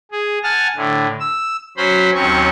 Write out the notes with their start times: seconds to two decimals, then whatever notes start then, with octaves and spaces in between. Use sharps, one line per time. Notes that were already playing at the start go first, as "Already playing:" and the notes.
0.12 G#4
0.43 F#5 G#5 A5 F6
0.76 A2 D3
1.20 E6
1.77 F#3 C#4 C5 B5
2.15 D#2 F#3 C4 C#4 C#6